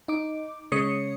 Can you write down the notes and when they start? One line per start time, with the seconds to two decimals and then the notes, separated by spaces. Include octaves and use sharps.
0.08 D#4 D6
0.72 C#3 G#3 C#5 D#6 C#7